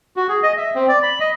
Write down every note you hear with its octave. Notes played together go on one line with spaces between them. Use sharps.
F#4
G#4
D#5
E5
C4
D5
B5
D#5